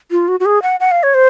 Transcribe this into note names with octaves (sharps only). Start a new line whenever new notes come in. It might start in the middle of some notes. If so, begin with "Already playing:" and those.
F4
F#4
F#4
G#4
F#5
F#5
F5
C#5
C5